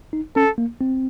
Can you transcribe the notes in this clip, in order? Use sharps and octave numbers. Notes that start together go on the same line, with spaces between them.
D#4
C#4 A4
A#3
C4